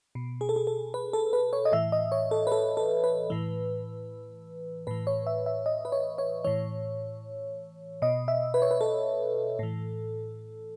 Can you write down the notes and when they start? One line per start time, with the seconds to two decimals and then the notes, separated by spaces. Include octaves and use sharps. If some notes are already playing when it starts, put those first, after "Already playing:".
0.15 B2
0.41 G#4
0.49 A4
0.56 G#4
0.67 A4
0.94 B4
1.13 A4
1.33 B4
1.53 C#5
1.65 D#5
1.72 A2 E3 E5
1.92 D#5
2.12 C#5
2.31 A4
2.47 B4
2.52 A4
2.77 A4
3.04 B4
3.30 A2 E3
4.87 A2 E3 B4
5.07 C#5
5.27 E5
5.46 E5
5.66 D#5
5.85 B4
5.92 C#5
6.18 C#5
6.44 A2 E3 C#5
8.02 B2 D#5
8.28 E5
8.54 B4
8.62 C#5
8.71 B4
8.81 A4
9.59 A2 E3